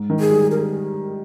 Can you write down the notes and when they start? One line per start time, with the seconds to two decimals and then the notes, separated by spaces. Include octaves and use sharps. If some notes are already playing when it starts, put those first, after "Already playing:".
Already playing: G#2
0.10 D#3
0.20 G#4
0.30 G3
0.51 A#4